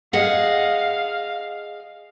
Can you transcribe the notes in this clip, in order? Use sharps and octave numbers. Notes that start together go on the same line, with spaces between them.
G#4 D#5 F5 F#5